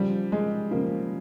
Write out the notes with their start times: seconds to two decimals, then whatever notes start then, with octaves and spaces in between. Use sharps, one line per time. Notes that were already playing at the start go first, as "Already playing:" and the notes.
Already playing: C#3 F3 G3
0.32 G#3
0.71 C#3 F3 A#3